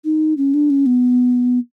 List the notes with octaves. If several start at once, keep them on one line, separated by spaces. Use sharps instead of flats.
D#4
C#4
D4
C#4
B3